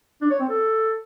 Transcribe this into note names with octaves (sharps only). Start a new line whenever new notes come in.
D4
C#5
C4
A4